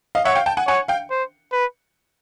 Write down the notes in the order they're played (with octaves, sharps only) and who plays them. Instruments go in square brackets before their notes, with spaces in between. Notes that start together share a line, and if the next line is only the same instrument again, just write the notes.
[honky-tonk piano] D#5 F5
[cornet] C#5 [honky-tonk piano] E5 F#5
[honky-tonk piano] F5 G5
G5 A5
F#5 G#5
[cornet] C#5 [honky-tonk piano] F#5 G#5
[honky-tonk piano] F5 G5
[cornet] C5
B4